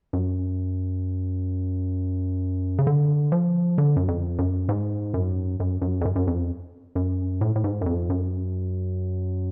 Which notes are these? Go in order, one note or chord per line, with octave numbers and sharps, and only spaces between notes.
F#2
C#3
D3
F3
D3
F#2
F2
F#2
G#2
F#2
F#2
F#2
F2
F#2
F#2
F2
F#2
A2
A2
G#2
F#2
F2
F#2